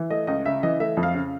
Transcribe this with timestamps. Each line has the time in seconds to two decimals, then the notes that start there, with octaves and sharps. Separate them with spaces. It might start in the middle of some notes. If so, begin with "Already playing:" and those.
Already playing: E3
0.10 A3 D#5
0.27 C#2 D#5
0.46 C#3 E5
0.63 E3 D#5
0.80 A3 E5
0.97 F2
1.03 F5
1.14 C#3